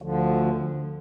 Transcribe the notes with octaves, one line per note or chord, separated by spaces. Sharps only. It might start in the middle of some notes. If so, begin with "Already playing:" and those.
D2 D3 F3